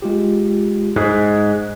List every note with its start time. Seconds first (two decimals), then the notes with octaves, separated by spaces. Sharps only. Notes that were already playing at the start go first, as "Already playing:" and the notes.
0.02 G#3 F4 G4
0.96 G#2 F#6